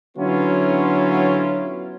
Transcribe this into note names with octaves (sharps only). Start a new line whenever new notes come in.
D3 F#3 B3 C#4 E4 F4